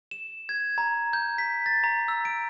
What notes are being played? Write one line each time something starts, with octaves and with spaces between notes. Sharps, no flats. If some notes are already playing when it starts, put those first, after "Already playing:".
E7
G#6
A#5
G6
B6
A6
A#5
E6
D7